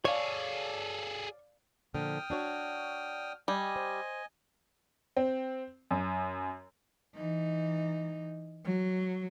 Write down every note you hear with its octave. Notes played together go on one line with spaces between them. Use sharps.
G#4 A4 C#5 D5 F5
A#2 D3 F3 G5 D#6 F6
D4 F#4 C#5
G3 D#5 G#5
C5
C4
F#2
E3 D#4
F#3